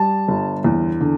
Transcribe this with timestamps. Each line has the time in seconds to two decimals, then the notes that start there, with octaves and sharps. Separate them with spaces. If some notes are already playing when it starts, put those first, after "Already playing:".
Already playing: G3 A5
0.28 G1
0.64 E2
1.00 D3